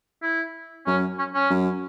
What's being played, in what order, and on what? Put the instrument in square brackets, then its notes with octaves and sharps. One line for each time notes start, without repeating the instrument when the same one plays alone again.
[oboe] E4
[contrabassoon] F#2 [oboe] C#4
[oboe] C#4
C#4
[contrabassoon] F#2